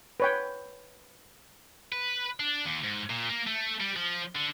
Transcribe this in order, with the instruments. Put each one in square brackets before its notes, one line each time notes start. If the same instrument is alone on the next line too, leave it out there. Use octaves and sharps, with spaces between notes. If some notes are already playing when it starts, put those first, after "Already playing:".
[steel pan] B4 C#5 G5
[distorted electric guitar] B4
D4
D#2
G#2
A#2
A#3
A3
G3
F3
D3